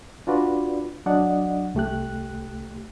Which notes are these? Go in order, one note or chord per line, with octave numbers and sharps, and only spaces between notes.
D4 F4 F#4 B4 D5
F#3 D4 D5 D#5 F#5
C2 A3 G4 F#6